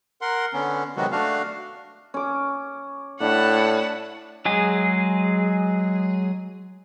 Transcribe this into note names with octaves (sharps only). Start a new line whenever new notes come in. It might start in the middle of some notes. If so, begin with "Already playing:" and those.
A#4 F#5 C6
D3 B3 C#4
C3 D#3 F#3 G#3 B3 F#4
A3 D4 F#4 F5
C#4 D6
A2 D4 F#5 A5 B5
F#3 G#3 G#4